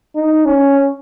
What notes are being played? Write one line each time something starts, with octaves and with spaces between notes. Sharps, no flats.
D#4
C#4